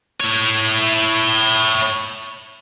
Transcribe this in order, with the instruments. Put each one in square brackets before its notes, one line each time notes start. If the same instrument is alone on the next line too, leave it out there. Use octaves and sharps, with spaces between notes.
[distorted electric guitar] E4 C#5